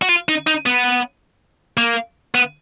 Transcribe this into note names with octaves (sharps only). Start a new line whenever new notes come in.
F#4
F4
D#4
D#4
B3
A#3
B3